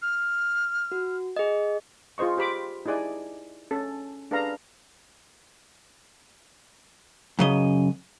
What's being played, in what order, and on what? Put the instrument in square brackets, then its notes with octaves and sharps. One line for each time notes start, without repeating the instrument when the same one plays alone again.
[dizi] F6
[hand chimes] F#4
G#4 D#5
[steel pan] F4 G#4 C5 D#5 C#6
G4 C5 B5 D6
D#4 E4 G#4 D5 G#5
C#4 A4
D4 G#4 A4 B4 F5 A#5
[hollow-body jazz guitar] F#2 C#3 D#5